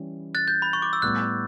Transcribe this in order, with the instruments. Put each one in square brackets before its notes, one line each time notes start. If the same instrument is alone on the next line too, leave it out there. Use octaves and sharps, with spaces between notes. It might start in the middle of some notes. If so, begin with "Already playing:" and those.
Already playing: [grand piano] E3 G3 C#4 E4
[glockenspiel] F#6 A6
G6
B5
C#6
D6
E6
[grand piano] A2 G3 B3 [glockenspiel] F#6